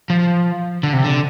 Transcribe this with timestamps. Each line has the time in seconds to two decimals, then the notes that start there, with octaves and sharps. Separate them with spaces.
0.10 F3
0.83 D3
0.93 C3
1.04 D3